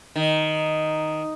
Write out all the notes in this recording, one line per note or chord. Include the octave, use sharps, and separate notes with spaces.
D#3